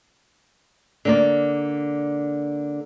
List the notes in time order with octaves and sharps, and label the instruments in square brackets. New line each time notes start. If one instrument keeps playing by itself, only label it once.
[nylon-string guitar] D3 A#3 D5